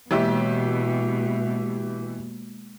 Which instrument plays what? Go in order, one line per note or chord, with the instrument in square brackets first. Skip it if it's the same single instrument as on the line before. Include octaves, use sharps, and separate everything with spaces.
[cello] B2 [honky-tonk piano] E3 G4 E5 [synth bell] G#3 A#3